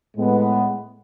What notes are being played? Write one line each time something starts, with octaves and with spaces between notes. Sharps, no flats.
A2 G#3 B3